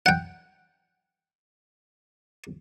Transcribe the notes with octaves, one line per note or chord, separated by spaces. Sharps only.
F#5 G5